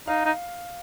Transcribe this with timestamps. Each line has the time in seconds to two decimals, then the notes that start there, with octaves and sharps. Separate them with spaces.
0.08 D#4 F5
0.26 D#4